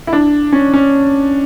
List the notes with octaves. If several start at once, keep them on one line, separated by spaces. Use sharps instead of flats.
E4
D4
C#4
C#4